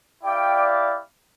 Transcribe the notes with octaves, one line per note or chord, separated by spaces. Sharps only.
E4 G4 D5 F5 G5